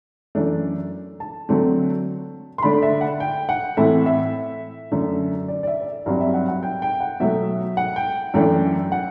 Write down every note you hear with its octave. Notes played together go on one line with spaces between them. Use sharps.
F#2 E3 A3 D4
A5
D3 F#3 A3 C4
C6
D3 A3 D4 B5
E5
F#5
G5
F#5
A2 E3 A3 C4 E5
E5
F#2 D3 A3
D5
D5
E5
D5
E5
G2 F#3 C4
E5
F#5
F#5
G5
G5
F#5
B2 F#3 A3 E5
F#5
G5
F#2 E3 A3 D4 G5
F#5